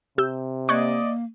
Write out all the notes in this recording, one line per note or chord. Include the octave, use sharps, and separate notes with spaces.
C3 G4 E6 G6
A#3 D5 D#5 C#6 F#6 G#6